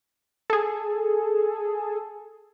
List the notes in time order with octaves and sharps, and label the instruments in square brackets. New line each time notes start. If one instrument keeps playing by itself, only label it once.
[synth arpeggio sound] G#4 A4